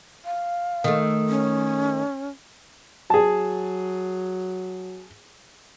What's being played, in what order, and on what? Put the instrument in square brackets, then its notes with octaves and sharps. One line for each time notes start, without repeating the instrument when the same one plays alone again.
[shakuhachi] F5
[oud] D#3 A3
[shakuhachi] C#4
[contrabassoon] F#3 [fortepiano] G#4 A5